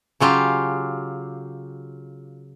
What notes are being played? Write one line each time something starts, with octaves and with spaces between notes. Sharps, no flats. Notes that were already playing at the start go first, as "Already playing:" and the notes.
C#3 F#3 F4 G4